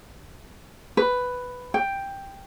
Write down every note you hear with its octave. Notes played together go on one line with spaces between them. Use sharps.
B4
G5